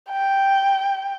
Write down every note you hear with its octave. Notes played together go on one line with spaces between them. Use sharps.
G5